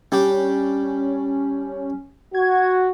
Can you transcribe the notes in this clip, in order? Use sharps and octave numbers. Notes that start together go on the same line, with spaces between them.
G3 C#4 D4 G4
F#4 G#6